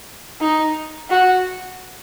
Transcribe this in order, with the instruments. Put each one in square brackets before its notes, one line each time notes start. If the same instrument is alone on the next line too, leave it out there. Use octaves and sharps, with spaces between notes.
[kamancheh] D#4
F#4